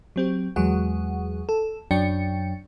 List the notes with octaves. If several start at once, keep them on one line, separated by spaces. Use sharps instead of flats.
F#3 C4 G4
E2 F#3 G#3 G#4 F#5
A4
F#2 F#3 D4 G5 C#7